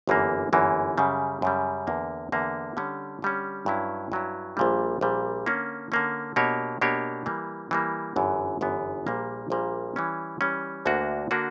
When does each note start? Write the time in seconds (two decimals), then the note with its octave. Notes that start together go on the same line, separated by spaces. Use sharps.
0.07 G1 F#2 E3 A#3
0.53 G1 F#2 E3 A#3
0.98 F#2 C#3 G3
1.42 F#2 C#3 G3
1.87 E2 D3 A#3
2.32 E2 D3 A#3
2.77 D3 G3 C#4
3.22 D3 G3 C#4
3.66 G2 F#3 C#4 E4
4.12 G2 F#3 C#4 E4
4.57 A#1 A#2 G3
5.01 A#1 A#2 G3
5.46 D3 A#3 C#4
5.92 D3 A#3 C#4
6.36 B2 A#3 D4 G4 C#5
6.81 B2 A#3 D4 G4 C#5
7.26 E3 G3 A#3
7.71 E3 G3 A#3
8.16 G1 F#2 E3 B3
8.61 G1 F#2 E3 B3
9.07 A#1 A#2 G3 A#3
9.50 A#1 A#2 G3 A#3
9.96 E3 G3 C#4
10.41 E3 G3 C#4
10.85 D2 D3 A#3 D4 F#4
11.31 D3 A#3 D4 F#4